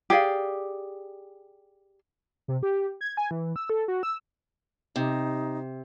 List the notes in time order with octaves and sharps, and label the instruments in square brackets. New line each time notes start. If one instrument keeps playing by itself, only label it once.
[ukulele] G4 G#4 D5 F5
[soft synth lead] C3
G4
G#6
G#5
E3
E6
A4
F#4
E6
[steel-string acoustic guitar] C3 [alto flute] D#4